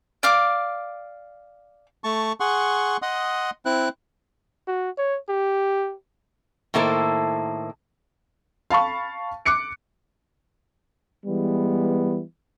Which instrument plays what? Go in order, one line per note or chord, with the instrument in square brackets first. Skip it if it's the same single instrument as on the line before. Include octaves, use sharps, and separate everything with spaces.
[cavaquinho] D5 F5 D6
[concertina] A3 A5 C#6
G#4 F#5 C6 C#6
D#5 F#5 C6 D#6
C4 E4 F#6
[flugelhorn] F#4
C#5
G4
[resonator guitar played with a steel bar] A2 D#3 A#3 E4 A4 C5
[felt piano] F5 A5 B5 C#6
D6 F#6 C#7 D7
[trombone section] E3 G3 G#3 B3